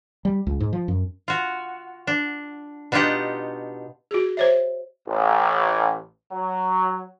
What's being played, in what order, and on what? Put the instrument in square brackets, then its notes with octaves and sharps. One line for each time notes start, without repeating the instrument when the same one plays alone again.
[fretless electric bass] G3
C#2
G#2
F3
F#2
[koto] F4 F#4
D4
B2 D4 D#4 F4 G4 F#5
[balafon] F#4 G#4
C5 C#5 E5
[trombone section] A1
F#3